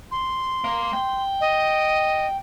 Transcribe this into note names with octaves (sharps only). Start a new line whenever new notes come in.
C6
A#3
G5
D#5